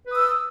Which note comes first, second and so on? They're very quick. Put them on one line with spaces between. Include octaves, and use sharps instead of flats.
B4 D#6 E6